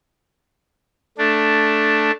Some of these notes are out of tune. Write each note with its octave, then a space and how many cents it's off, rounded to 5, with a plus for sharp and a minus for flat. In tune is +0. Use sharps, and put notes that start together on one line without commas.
A3 +0 D4 +0